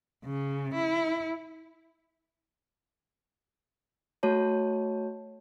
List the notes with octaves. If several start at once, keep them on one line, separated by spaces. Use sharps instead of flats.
C#3
E4
A3 F#4 C#5 A5